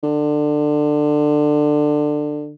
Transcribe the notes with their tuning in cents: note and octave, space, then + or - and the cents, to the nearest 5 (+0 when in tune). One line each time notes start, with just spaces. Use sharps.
D3 +20